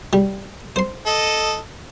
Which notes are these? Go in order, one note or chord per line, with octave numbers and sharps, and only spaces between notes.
G3
C5 C6
A4 D#5